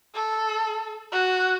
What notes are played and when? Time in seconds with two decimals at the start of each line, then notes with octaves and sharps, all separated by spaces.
0.15 A4
1.12 F#4